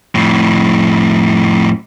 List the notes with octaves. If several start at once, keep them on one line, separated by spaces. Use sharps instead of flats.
F2 A2